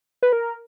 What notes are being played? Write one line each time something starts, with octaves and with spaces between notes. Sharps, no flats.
B4
A#4